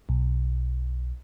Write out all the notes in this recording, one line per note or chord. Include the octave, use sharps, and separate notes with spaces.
B1